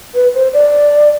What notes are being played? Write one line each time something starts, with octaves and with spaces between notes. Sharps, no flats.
B4
C5
D5